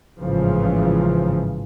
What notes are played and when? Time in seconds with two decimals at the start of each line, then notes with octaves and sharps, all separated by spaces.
0.19 A1 G#2 C#3 E3 F3